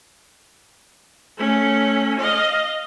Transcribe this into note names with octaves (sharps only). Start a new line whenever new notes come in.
A3 C#4
D#5 F5